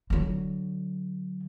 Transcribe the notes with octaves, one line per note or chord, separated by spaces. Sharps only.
D3 F#3